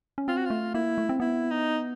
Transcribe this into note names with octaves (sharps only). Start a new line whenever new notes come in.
C#4
C4 F4
F#4
A3 F4
A#3 E4
A3
C4
B3 E4
D#4